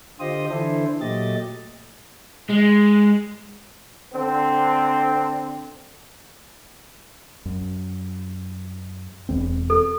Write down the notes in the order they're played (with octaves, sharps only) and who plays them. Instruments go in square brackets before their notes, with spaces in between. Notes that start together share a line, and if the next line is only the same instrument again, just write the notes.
[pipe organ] D3 F4 G4 C5 D#5 D#6
D3 E3 D4 E4 A4 C5
A#2 F#3 A3 G4 D#5 A6
[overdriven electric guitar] G#3
[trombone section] D3 C4
[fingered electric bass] F#2
E1 E2 C4
[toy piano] A4